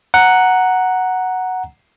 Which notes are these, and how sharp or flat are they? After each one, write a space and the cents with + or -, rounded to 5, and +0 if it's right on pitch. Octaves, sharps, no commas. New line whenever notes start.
F#5 +0 A#5 +0